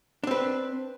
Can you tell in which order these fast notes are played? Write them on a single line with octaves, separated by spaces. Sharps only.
D4 C4 B4